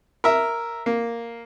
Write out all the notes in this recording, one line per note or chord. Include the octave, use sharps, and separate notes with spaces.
A#4 E5
A#3